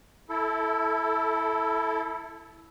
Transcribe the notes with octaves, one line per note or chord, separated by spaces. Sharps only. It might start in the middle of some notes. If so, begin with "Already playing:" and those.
E4 A4